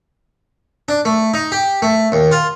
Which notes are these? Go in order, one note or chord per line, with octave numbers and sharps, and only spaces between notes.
D4
A3
D#4
G4
A3
D#2
F4